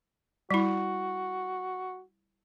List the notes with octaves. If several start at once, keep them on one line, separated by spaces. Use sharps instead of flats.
G3 E4 F#4